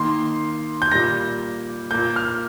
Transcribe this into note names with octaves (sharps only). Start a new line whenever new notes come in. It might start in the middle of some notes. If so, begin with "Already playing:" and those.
Already playing: D#3 A#3 C6
G6
A#2 G3 A#3 A#6
A#2 A#3 G6
F6